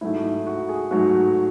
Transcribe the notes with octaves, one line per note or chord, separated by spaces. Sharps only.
G#2 F#3 A3 E4
D#4
F#4
G#4
G#2 F#3 A3 F#4